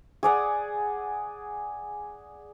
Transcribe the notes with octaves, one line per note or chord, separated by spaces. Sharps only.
G#4 D5 F#5